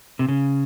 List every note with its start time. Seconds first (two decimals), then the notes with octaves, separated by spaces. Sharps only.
0.19 C3
0.28 C#3